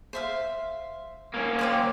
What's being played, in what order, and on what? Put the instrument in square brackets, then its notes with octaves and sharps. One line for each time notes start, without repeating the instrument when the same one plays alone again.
[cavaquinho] C5 E5 F5
[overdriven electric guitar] A#3 C#4
[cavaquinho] C5 D5 G5